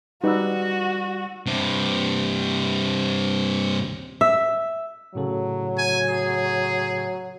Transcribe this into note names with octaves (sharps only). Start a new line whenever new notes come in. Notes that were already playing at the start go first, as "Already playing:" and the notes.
G3 D#4 F#4 B4 D5 E6
G2 C3
E5
A2 C#3 F#3 A4
G#5
G#4